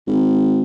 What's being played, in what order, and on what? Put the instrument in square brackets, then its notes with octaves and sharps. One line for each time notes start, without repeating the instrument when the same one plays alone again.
[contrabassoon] G#1